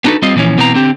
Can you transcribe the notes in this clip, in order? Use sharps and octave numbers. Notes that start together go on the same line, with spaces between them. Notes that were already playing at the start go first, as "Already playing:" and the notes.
B3 D4 D#4 F#4 A4 B4
G3 C4 F4 D#5
A#2 E3 F3 C#4
B2 E3 B3 C4 C#5 A#5
D3 C4 G4